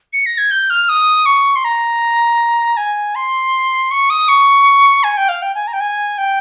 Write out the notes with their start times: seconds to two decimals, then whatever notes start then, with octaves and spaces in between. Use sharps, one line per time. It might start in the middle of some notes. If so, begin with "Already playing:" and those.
0.13 C#7
0.26 A#6
0.38 G#6
0.51 G6
0.70 F6
0.89 D#6
1.26 C#6
1.56 C6
1.65 A#5
2.77 G#5
3.15 C6
3.91 C#6
4.10 D#6
4.28 C#6
5.04 G#5
5.17 G5
5.29 F5
5.42 G5
5.55 G#5
5.67 A#5
5.73 G5
5.80 G#5
6.18 G5